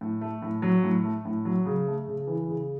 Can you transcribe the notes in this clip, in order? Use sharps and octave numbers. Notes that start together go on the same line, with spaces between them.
A2
A3
A2
F#3
A2
A3
A2
F#3
C#3
A3
C#3
E3
C#3